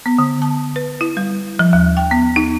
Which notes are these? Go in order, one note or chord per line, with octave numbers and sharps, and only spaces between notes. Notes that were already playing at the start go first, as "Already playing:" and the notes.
B3
D3
A5
B4
E4
G3
F3
D#2
G5
B3
D#4